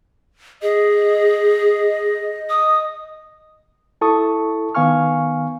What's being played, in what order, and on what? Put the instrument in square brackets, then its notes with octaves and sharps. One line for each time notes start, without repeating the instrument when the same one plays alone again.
[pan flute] G#4 [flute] D#5
[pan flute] D#6
[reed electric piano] E4 A4 A5 C#6 D#6
D#3 B3 F5 G#5 C#6 F6